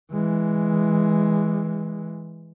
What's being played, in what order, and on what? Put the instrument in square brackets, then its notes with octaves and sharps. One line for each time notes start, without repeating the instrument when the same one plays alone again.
[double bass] E3 G#3